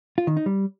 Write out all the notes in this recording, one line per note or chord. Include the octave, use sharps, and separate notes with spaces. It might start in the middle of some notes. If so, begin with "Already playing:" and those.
F4
D#3
D#4
G3